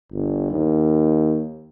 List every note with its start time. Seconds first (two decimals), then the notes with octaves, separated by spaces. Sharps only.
0.12 G1
0.51 D#2